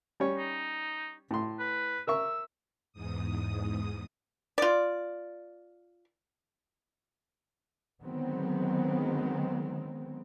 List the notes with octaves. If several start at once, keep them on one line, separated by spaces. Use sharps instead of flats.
G3 C#4 C#5
D#4
A2 C6
B4
A#4 E5 C#6 E6
E2 G#2 D#6
F4 D5
D3 D#3 F#3 G#3 B3 C4